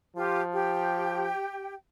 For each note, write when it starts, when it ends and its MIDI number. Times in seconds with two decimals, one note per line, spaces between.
0.16 1.29 53
0.16 0.40 65
0.16 0.40 67
0.53 1.74 67
0.53 1.74 79